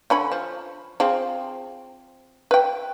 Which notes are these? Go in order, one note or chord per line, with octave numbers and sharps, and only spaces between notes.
D3 C#4 B5
F3
F3 C4 G#4
B4 G5